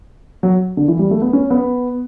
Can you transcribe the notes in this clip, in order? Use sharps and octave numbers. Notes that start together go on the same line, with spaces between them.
F#3
D3
E3
G3
A3
B3
C#4
B3